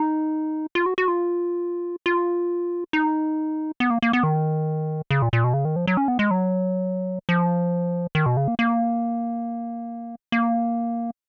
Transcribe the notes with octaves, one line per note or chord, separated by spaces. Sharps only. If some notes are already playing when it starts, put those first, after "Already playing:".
Already playing: D#4
F4
F#4
F#4
F4
F4
D#4
B3
A#3
A#3
B3
D#3
C#3
A#2
A#2
B2
C#3
D#3
F3
F#3
C#4
B3
G#3
F#3
F3
D#3
B2
C#3
A#3
A#3
A#3